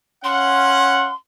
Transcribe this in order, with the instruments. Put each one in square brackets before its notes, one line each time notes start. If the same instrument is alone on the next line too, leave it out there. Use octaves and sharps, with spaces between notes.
[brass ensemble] C#4 F5 F#5 [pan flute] C6